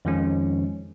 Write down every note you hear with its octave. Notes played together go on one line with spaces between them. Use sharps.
F2 D#3 F3 G#3 C#4